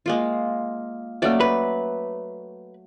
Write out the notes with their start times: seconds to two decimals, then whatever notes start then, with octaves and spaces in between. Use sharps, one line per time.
0.06 G#3 A#3 F4
1.22 F#3 A3 A#3 C#4 D5
1.40 B4